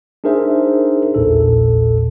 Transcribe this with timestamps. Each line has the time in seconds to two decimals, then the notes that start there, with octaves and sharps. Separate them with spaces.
0.24 D4 D#4 G#4 A#4 C5 E5
1.14 A#1 E2 A#2 A4